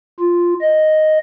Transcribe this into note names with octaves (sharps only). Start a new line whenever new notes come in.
F4
D#5